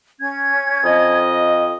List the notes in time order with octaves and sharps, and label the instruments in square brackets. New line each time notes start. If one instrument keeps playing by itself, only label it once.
[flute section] C#4 G#6
[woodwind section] F2 D#5